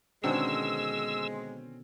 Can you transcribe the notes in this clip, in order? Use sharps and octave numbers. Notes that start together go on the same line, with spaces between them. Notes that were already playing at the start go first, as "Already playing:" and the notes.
B2 D3 D#3 G#3 C4 C#4 E6